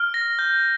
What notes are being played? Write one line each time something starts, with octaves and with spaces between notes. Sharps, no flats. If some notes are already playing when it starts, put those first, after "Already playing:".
Already playing: F6
A#6
G6